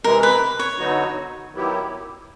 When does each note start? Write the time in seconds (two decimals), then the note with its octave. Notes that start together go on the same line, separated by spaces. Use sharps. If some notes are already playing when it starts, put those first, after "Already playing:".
0.04 C3 E3 G#3 A#4
0.23 B4
0.59 C#5
0.78 D3 F#3 B3 D#4 F#4
1.52 D#3 F#3 B3 E4 G4